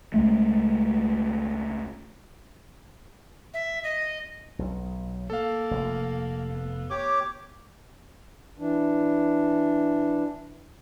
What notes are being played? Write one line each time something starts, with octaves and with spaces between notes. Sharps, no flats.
C#2 G#3 A3
E5
D#5
B1
A#3 A4 F5
F1
B3
G4 C#5 D6
E3 D4